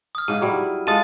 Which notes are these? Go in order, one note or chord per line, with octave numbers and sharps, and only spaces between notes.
D#6 F6
G#2 C#3 D#7
F#3 G3 E4
G#3 F4 A4 D#6 A6 D#7